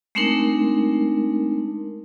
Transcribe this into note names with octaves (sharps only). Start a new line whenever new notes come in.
G#3 A3 C4 D4 D#4 A#4